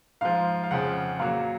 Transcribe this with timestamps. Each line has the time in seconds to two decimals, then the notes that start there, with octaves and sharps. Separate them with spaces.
0.21 G#2 F3 F5
0.64 F5
0.71 F2 C#3 F3 F#5
1.19 A#2 F#3 F5